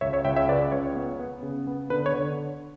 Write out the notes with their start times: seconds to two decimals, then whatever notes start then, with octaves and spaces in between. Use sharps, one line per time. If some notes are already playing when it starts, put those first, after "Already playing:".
0.01 C#2 C#5 E5
0.13 C#5 E5
0.24 C#2 E5 G5
0.36 C#5 E5
0.48 C#3 B4 D5
0.72 C#2 C#5
0.96 B3
1.19 B3
1.43 C#3
1.67 B3
1.90 D3 B4
2.06 C#5
2.14 D3